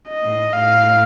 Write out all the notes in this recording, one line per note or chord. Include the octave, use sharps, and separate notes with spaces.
D#5
A2
A2 F5